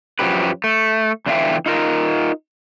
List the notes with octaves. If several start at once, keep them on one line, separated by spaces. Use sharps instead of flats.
F#2 B2 F3 F#3 G4 B4
A3
E2 D3 E3 F4 E5 G5
D#4 F4 A#4